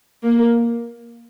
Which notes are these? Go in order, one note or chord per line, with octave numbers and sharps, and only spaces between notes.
A#3